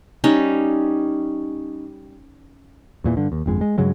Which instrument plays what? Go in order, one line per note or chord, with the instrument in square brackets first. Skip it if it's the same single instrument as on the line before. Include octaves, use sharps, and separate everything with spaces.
[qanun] G3 C#4 D#4
[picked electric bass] E2 A#2 E3
G2 D3
D#2
G1 F2 G#3
G#3
G2 C#3 F#3 G#3